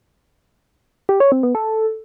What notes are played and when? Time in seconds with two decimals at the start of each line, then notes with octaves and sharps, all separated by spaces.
1.09 G4
1.20 C#5
1.32 C4
1.43 B3
1.55 A4